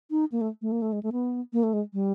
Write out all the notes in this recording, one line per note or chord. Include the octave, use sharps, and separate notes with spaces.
D#4
A#3
A3
A3
A#3
A3
G#3
A3
B3
A#3
A3
G#3
G3